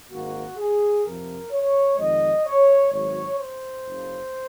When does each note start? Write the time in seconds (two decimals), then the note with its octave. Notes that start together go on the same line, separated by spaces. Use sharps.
0.11 G#1 G#2 D#3 A#3 F#4
0.57 G#4
1.04 F2 C3 F3 A#4
1.52 C#5
1.98 F2 D#3 G#3 D#5
2.46 C#5
2.92 G#1 G#2 F#3 C#5
3.39 C5
3.86 F#1 F#2 C#3